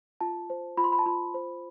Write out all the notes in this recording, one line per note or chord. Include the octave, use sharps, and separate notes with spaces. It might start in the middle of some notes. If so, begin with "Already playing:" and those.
F4 A5
C5
F4 B5
C6
B5
A5
F4 B5
C5